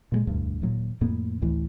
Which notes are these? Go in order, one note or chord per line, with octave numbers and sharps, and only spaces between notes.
A#2 F#3 G#3
E1 D2 G2
D#1 D#2 A#2 F#3
F2 A2 A#3 B3
A1 D2 A2 E3